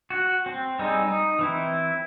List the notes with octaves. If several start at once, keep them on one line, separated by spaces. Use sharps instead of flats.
F#4
C4
G3 G#3 C4 D#4
D#4
E3 C4 E4